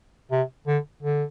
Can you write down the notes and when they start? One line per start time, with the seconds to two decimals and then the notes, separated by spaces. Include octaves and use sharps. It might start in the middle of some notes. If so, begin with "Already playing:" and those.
0.32 C3
0.67 D3
1.03 D3